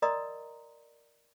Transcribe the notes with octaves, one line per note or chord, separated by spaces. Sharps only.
A#4 D5 D#5 A#5 C6 D#6